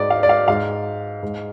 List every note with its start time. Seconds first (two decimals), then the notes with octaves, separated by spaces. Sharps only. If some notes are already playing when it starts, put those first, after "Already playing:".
Already playing: G#2 D5
0.10 F5
0.23 D5
0.29 F5
0.48 G#2 F5
1.23 G#2